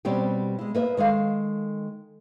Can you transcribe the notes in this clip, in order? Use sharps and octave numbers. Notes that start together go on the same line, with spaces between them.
B2 G3 C4 C#4 G4
G#3 E4
A#3 B4 E5
D#3 G#3 A4 F5